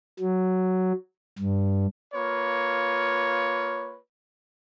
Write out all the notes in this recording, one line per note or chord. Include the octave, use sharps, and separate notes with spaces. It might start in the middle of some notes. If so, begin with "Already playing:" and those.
F#3
G2
A#3 F4 B4 C#5